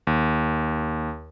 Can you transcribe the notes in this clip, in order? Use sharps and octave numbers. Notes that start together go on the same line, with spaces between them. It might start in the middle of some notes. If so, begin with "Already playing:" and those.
D#2